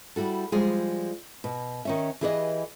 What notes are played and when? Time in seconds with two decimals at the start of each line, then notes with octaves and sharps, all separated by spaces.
0.16 G3 E4 F#4 A4
0.52 F3 G3 G#3 F4 G#4
1.44 B2
1.85 D#3 C#4 E5
2.21 E3 G4 G#4 B4 C#5 D#5